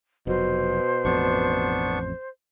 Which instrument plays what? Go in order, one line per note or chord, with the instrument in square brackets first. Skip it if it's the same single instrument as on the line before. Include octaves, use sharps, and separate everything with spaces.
[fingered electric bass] F1 F#3 [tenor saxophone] B2 [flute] C5
[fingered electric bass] A1 F2 [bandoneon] B3 D4 C#6